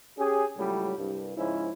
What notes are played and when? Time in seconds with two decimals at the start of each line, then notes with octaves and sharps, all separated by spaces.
0.18 C#4 G4 G#4
0.57 C#2 A2 F#3 G3
0.98 C2 G2
1.37 G#2 C#3 F3 C#4 E4